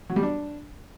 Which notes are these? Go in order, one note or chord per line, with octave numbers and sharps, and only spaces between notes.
F#3
G3
D4